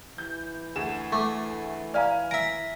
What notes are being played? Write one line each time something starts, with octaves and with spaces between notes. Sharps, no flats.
E3 G6
D2 G#4 E7
A3 C#6 D6
D5 F5 G#5 A#5 F6
E5 A#5 D7